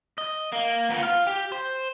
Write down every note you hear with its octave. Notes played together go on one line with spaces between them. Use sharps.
D#5
A#3
B3 F4
F4 F5
G4
C5